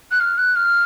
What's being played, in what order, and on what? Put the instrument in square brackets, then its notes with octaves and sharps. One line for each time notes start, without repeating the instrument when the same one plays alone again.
[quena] F#6
F6
F#6
F6